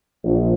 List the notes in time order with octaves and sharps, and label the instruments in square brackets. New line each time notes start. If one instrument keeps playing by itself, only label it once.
[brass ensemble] A#1